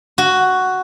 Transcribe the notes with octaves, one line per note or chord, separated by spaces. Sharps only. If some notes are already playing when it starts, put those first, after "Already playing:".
F#4